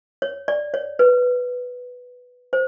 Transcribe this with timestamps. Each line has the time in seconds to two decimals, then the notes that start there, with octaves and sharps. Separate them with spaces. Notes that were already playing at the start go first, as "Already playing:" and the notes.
0.22 C#5
0.48 D5
0.74 C#5
0.99 B4
2.53 C5